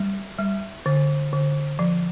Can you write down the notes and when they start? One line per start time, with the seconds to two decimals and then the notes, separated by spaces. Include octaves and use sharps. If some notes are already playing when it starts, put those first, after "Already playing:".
Already playing: G3
0.38 G3
0.86 D3
1.33 D3
1.79 F3